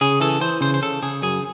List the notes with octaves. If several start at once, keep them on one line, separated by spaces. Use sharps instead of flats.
C#3 G#4
E3 A4
E3 C5
C#3 C5
C5
C#3 A4
C#3 G#4
F#2 G#4